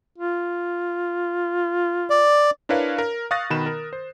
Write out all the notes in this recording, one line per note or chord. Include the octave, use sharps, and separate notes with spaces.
F4
D5
D4 E4 A#4 B4 C#5 F5
A#4
F5 C#6 D#6 F#6 A6 A#6
B2 D#3 B5 E7
A#4
C5